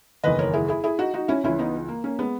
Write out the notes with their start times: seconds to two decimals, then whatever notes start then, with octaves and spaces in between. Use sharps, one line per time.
0.24 F#1 E2 D#3 B4 D#5
0.39 A#4 C#5
0.53 E4 G#4
0.68 E4 G#4
0.84 E4 G#4
0.99 D#4 F#4
1.14 D#4 F#4
1.28 C#4 E4
1.44 C#2 C#3 E3 C#4 E4
1.59 B3 D#4
1.89 A#3
2.04 A#3 C#4
2.19 G#3 B3